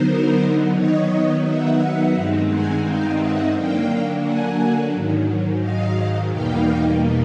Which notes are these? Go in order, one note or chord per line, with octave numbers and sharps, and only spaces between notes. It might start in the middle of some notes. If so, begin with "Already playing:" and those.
Already playing: D3 F#3 B3 D#4 A#4 C5
D#3 F#3 B3 D#4 C#5 D#5
E5 F#5
G2 D#3 G#3 C4 D#4
F#5 G#5
F5 G5
E5 F#5
D3 F#3 A#3 D4 F5 G5
F#5 G#5
G#2 D#3 F#3
D#5 F5
E2 B2 G3 A#3 D#4 F5 G5